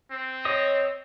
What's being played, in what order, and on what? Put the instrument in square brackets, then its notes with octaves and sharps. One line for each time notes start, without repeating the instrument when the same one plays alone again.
[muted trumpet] C4
[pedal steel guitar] C#5 D#5 D#6